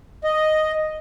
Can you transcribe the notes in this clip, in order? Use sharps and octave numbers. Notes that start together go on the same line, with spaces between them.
D#5